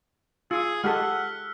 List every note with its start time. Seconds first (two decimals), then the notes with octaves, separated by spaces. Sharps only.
0.51 F4 G#4 E6 C#7
0.84 G#3 G4 A4 F#5 F6 F#6 B6